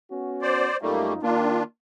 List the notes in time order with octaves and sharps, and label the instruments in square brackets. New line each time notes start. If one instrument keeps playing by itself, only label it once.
[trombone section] B3 C#4 F#4
[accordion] C5 D5
[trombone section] F#2 D#4 F4 [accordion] G3 A3 A#3
[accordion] D#3 D4 F4 [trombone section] A#3